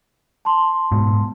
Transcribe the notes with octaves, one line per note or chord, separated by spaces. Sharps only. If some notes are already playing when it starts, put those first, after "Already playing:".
A5 C6
G#2 B2